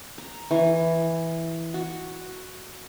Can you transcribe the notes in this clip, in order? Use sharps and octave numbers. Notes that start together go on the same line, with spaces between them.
A#5
E3
F#4